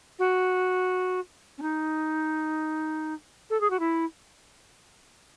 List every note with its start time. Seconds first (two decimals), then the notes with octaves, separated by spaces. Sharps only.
0.19 F#4
1.58 C#4
1.62 D#4
3.50 A4
3.61 G#4
3.70 F#4
3.79 E4